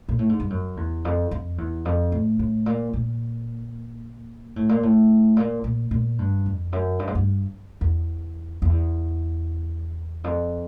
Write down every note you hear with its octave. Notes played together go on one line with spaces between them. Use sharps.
A#2
A2
G#2
G2
F#2
E2
F2
F2
E2
F2
A2
A2
A#2
A#2
A2
A#2
A2
A#2
A#2
A#2
G2
F2
F#2
G2
G#2
G2
E2
E2
F2